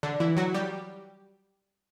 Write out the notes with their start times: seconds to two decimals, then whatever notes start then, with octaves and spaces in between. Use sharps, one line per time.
0.03 D3 D4
0.20 E3 E4
0.37 F#3 F#4
0.54 G3 G4